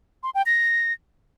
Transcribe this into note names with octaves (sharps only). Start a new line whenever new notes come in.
C6
G5
A#6